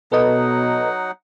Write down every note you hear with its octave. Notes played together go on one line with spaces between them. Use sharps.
B2 F#3 D#4 A4 B4 D#5 F#5